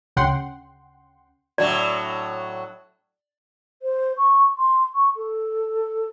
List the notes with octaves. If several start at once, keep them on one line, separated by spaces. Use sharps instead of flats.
D2 C#3 F#5 G5 C6
A2 F#3 D4 D5
C5
C#6
C6
C#6
A4